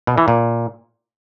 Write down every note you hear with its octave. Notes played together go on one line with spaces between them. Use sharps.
B2
E3
A#2